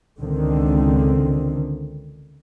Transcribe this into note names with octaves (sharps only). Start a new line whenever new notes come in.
C#2 D3 D#3 C4